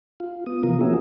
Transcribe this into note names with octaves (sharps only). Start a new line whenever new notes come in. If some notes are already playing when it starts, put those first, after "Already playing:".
F4
B3 D#6
C3 E3 F3 B3 F4 A#4
A#3 C#4 F#4 G#4 A#4 E5